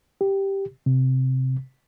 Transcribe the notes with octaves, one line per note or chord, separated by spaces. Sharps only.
G4
C3